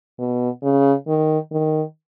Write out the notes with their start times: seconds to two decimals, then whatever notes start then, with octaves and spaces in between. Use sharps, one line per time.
0.19 B2
0.63 C#3
1.07 D#3
1.52 D#3